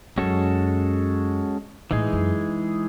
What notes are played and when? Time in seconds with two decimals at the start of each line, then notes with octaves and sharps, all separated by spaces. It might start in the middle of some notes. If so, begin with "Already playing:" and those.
0.16 F#2 G#3 C#4 F#4 A4
1.91 A2 E3 G#3 D#4 G#4
2.13 F#2